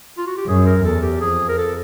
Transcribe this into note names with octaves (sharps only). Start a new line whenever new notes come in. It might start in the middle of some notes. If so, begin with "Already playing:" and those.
F4
F#4
G4
F#2 G#4
A#4
E2 A4
G4
F2 G#4
A#4
A4